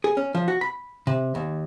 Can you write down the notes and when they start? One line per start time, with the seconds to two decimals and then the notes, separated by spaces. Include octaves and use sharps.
0.04 G#4
0.17 C#4
0.35 F3
0.48 F#4
0.61 B5
1.07 C3
1.35 D#2